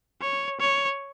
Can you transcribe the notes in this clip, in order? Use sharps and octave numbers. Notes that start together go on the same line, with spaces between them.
C#5
C#5